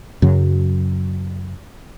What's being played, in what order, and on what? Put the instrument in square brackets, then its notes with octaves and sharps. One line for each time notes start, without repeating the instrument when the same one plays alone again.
[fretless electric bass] F#2 C#3 F#3